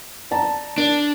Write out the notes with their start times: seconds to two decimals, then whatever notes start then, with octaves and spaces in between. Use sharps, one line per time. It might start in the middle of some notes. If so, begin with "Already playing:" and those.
0.31 D5 A5 A#5
0.78 D4 A#4